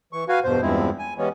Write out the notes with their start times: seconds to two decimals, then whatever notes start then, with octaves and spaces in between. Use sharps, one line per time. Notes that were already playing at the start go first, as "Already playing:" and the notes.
0.13 E3 C#6
0.28 F#4 B4 F5 G#5
0.44 E2 G2 B2 C5
0.61 E2 G2 F3 G#3 C4 E4
0.99 G#5
1.18 E3 G3 G#3 B3 C#4